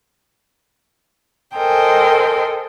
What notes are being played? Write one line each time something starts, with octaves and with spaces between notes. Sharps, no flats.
A4 A#4 C5 D#5 G5 G#5